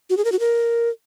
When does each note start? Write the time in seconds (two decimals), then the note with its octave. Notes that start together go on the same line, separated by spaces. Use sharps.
0.10 F#4
0.17 G#4
0.25 A#4
0.32 F#4
0.40 A#4